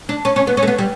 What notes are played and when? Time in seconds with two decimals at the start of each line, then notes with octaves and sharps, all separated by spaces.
0.09 D4
0.25 C#4
0.36 C#4
0.47 B3
0.57 C#4
0.63 A3
0.67 B3
0.78 G3